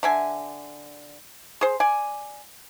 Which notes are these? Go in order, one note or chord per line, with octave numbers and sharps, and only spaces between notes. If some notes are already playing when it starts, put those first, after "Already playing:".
D3 E5 G#5
G#4 C5
D5 G#5